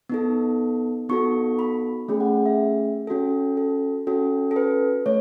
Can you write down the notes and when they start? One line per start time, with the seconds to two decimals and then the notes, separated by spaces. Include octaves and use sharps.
0.09 B3 D#4 A4
1.09 B3 D#4 F#4 A4 C#6
1.59 B5
2.08 A3 C#4 G#4
2.20 F#5
2.46 E5
3.07 C#4 F#4 A4
3.57 A4
4.07 C#4 F#4 A4
4.51 A4
4.56 B4
5.06 A3 C#5